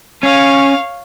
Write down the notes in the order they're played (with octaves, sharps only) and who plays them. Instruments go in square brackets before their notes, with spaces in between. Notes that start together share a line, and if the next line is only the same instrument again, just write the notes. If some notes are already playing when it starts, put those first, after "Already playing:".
[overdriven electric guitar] C#4 [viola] C#5 F5